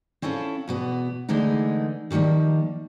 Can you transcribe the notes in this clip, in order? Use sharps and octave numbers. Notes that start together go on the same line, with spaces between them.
C4 C#4 E4 F4 A4
E2 B2 B3
D3 E3 G#3 A3 D#4
D3 D#3 F3 G3 A#3